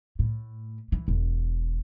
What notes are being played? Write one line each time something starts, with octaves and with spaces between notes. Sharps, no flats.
A2
E3
E1